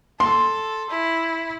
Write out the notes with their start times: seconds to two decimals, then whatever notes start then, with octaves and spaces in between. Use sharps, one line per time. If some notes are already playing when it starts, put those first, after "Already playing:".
0.20 A4 C6
0.90 E4